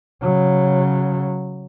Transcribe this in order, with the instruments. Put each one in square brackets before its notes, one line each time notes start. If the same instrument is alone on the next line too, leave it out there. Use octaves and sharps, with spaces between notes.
[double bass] C#3 F#3